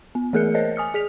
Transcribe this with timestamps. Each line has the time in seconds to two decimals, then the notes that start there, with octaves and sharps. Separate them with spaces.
0.15 B3
0.33 E3 A3 G#4 A#4 F#6 C#7
0.55 A#4 C5 C#5 D#5
0.76 G#5 D#6 F6 C#7
0.94 G#4 B6 F7